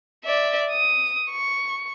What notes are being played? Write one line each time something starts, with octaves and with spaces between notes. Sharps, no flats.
D5 E5
D#6
C#6